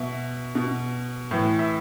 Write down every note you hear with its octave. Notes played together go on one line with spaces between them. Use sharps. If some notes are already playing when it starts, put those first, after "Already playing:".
Already playing: B2 E5
B2
A2 E3
E5